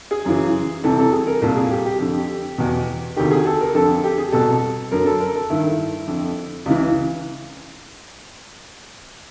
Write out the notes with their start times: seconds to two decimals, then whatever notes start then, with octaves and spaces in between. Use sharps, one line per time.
0.11 G#4
0.25 F#2 C#3 E3
0.83 C2 C3 E3 A4
0.98 A4
1.12 G#4
1.27 A#4
1.42 C2 A#2 A4
1.56 G#4
1.71 G4
1.85 G4
2.00 F2 D3
2.58 E2 B2
3.16 D2 C3 D#3 G4
3.31 G#4
3.46 A4
3.60 A#4
3.74 F2 D3 A4
4.04 G4
4.18 G#4
4.32 C2 B2 A4
4.91 F#2 D3 A#4
5.06 A4
5.20 A#4
5.35 A4
5.50 G2 D#3 E4
6.08 F2 D3
6.66 C#2 C#3 E3